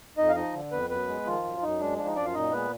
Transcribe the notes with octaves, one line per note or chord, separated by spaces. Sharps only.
F2 D#4 D#5
F5
F3 D#4 D#5
D3
F2 B3 B4
F#2 B3 B4
G#3
D#3 F3 F4
F#2
F#2 D#4
G#3 D4
F3 D4
D#4
F#2 D4 D5
F4 F5
A#2 D#4 D#5
G#3 B3 B4